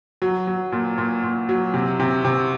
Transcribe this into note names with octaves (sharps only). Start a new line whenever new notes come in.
F#3
F#3
A#2
A#2
A#2
F#3
C3
C3
C3